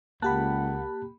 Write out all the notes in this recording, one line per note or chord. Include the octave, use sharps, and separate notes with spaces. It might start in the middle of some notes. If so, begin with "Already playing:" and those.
C#2 A#3 G4 F#5 A5 B5 F#6